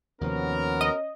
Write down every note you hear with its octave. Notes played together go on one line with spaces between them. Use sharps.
D#2 C3 F3 B3 C#4 F#4 A#4
D#5